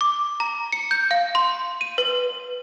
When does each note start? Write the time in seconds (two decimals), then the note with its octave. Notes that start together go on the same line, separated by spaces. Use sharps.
0.01 D6
0.40 A#5
0.72 C#7
0.91 G6
1.11 F5
1.35 C6
1.81 D#7
1.98 B4